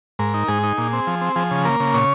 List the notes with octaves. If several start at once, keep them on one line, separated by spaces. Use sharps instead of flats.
G#2 A#4
D#4
G#2 G#4
D#4
A#2
C4
F3
C4
F3 G#4
C#3
A#3 A#4
C#3
A#2 C#5